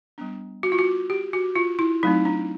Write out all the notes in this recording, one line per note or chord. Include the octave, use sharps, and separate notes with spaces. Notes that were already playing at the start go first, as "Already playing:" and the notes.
G3 B3 D4
F#4
F4
F#4
G4
F#4
F4
E4
F#3 A3 C4 D#4
D4